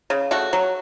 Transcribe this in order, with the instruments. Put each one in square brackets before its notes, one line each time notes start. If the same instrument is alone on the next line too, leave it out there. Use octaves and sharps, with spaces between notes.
[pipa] C#3
A3 F#4
F#3